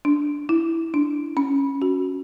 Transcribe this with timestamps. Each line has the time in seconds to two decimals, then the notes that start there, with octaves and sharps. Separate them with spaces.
0.05 D4
0.49 E4
0.94 D4
1.37 C#4
1.82 F#4